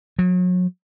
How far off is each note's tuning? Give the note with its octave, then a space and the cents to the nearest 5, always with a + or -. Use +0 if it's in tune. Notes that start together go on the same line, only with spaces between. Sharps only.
F#3 -35